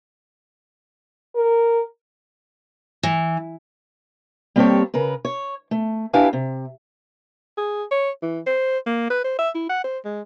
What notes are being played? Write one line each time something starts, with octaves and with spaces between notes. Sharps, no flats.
A#4
E3
G3 A#3 C4 G4 A4 C#5
C#3 A#4 B4
C#5
A3
D4 E4 G4 B4 F5 G#5
C3
G#4
C#5
E3
C5
A#3
B4
C5
E5
E4
F#5
C5
G#3